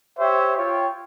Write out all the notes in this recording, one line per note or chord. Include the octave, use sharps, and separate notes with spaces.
G4 C5 C#5 E5
F4 C#5 G5